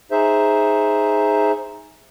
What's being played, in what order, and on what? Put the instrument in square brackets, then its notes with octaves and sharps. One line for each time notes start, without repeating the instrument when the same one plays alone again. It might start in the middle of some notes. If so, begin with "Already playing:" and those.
[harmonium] D#4 G#4 C5 E5